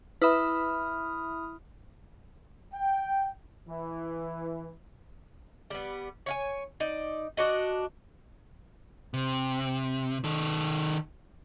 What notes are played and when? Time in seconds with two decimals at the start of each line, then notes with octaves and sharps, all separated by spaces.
0.22 E4 B4 E5 B5 D#6 F6
2.74 G5
3.69 E3
5.70 G3 B3
6.26 C#5 F5 G#5
6.80 D#4 D5
7.37 D4 F#4 D#5
9.14 C3
10.24 D#3 A4